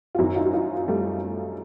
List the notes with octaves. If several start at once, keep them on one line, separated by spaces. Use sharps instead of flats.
F4
F#2 D#3 E4 F#4
D#4 F4
F#4
D#4 F4
G3 A3